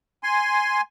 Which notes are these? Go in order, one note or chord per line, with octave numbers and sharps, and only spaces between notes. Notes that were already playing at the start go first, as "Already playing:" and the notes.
G#5 C6